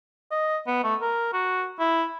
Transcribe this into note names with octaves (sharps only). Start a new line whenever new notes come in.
D#5
B3
A3
A#4
F#4
E4